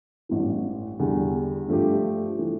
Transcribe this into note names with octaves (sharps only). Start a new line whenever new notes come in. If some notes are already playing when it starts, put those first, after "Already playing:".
A1 G2 E3
E2 D3 G3
G2 F3 A3 D4 G4
E3 A3